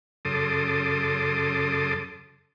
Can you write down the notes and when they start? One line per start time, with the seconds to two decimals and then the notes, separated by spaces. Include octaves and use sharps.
0.25 F#2 C#3 A4 C6 D6 D#6